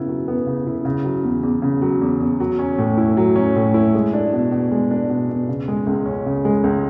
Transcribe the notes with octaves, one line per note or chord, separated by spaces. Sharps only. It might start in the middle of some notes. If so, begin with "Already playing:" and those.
Already playing: C#3 B3 E4
F#3
B3
C#3
E4
C#3
F#3
E2
E2
C#3
F#3
E2
E2
F#3
C#4
A2
E4
F#3
C#4
A2
E4
G#3
D4
B2
B2
G#3
D4
B2
B2
C#3
G#3
C#2
C#4
C#3
G#3
C#2